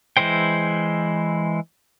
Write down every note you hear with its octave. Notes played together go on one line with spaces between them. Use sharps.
E3 G#3 E4 C5 G5